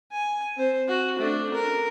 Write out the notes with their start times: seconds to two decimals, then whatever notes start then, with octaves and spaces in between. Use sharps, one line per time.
0.12 G#5
0.57 C4 C5
0.88 F#4
1.19 A3 D4
1.54 A#4